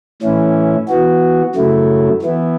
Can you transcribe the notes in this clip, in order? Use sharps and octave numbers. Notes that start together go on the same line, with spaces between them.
A2 E3 C#4 E4
E3 B3 F#4
F#2 C#3 F#3 A3 E4
E3 B3 E4